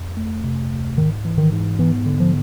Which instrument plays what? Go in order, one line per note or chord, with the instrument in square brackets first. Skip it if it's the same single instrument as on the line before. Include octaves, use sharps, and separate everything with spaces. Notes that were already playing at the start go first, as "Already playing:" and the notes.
Already playing: [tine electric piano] F2
A3
C3
D2
[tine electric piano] G#2 [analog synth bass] D#3
[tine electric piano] E3
[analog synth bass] D#3
[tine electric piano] G#2
[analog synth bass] E3 [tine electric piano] B3
[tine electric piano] D3
[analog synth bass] F3